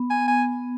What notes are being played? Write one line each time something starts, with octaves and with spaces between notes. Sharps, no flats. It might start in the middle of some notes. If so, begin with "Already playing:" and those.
Already playing: B3
G#5
G#5